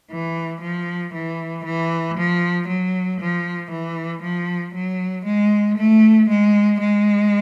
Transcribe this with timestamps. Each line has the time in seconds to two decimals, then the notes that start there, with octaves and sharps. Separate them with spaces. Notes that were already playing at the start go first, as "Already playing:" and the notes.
0.10 E3
0.61 F3
1.14 E3
1.64 E3
2.17 F3
2.67 F#3
3.19 F3
3.70 E3
4.22 F3
4.74 F#3
5.25 G#3
5.77 A3
6.29 G#3
6.80 G#3